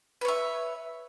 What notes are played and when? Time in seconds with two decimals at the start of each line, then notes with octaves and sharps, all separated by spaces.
0.21 B4
0.25 C#5
0.28 E5